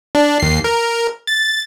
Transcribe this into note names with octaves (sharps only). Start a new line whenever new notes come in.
D4
D#2 C7
A#4
A6